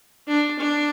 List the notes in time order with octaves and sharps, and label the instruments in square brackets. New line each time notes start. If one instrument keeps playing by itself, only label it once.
[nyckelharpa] D4
D4